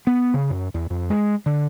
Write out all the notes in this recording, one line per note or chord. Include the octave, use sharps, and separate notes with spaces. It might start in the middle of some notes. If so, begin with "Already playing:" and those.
B3
C#3
F#2
E2
F2
G#3
D3